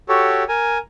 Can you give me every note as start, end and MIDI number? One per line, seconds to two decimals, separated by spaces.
0.09 0.43 66
0.09 0.43 67
0.09 0.43 69
0.09 0.43 73
0.49 0.78 70
0.49 0.78 80